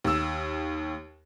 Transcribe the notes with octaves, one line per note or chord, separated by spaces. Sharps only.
D#2 E6